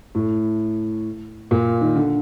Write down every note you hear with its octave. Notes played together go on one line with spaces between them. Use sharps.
A2
A#2
D#3
D3